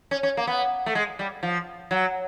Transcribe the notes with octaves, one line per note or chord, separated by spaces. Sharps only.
C#4
C#4
A#3
B3
A3
G#3
G3
F3
F#3